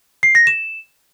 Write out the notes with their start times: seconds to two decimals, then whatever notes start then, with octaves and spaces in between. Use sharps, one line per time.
0.23 C7
0.35 A#6
0.47 E7